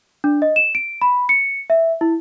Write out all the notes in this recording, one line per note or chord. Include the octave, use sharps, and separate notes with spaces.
D4
D#5
E7
D7
B5
C#7
E5
E4